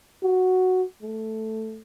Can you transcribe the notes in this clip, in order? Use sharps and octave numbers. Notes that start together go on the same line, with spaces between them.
F#4
A3